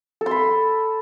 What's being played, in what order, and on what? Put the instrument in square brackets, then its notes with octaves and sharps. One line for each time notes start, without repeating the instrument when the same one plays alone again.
[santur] A4
C6
B5